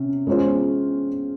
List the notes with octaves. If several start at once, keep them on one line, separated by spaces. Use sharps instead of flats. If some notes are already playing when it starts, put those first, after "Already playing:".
Already playing: C3 C#4
G#3 C#4 F4 C5